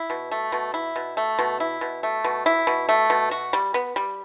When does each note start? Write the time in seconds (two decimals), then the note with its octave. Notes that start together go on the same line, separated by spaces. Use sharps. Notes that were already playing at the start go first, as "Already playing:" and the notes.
Already playing: E4
0.10 B2
0.31 A3
0.52 B2
0.74 E4
0.96 B2
1.17 A3
1.39 B2
1.60 E4
1.81 B2
2.03 A3
2.24 B2
2.46 E4
2.67 B2
2.89 A3
3.10 B2
3.31 F#4
3.53 G3
3.74 B3
3.96 G3